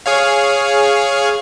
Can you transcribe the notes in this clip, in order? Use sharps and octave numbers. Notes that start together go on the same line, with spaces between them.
G#4 C#5 F5